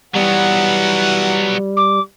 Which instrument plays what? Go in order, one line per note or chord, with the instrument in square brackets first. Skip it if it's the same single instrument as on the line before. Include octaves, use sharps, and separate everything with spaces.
[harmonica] E3 F#5 [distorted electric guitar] F#3 B3 [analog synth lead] G3
[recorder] D6